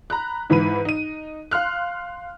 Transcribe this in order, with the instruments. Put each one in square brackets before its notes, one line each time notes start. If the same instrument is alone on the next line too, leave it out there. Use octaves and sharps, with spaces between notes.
[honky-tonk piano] A#5 B5 F#6
G#2 E3 B4 B5 D#7
D#4 D#7
F5 C6 F6 F#6